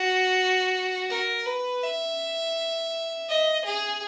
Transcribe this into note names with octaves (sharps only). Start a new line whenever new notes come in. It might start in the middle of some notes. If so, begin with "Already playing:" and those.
Already playing: F#4
A#4
B4
E5
D#5
G#4